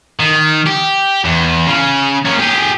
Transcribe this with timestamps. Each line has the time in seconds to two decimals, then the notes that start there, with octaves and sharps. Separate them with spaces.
0.20 D#3
0.66 G4
1.25 E2
1.67 C#3
2.25 A#3 C#4
2.39 G4 G#4